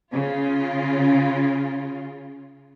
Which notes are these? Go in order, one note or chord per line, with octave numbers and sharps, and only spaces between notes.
C#3 F4